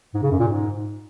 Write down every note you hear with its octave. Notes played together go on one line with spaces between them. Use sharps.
G#2
C#3
F#2
A#2
G#2